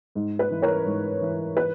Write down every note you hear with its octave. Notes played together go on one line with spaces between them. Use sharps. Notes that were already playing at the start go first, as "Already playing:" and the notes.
G#2
B4
E3
A#4 C#5
G#2
E3
B4